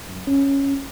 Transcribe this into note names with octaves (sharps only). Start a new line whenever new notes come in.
F#2
C#4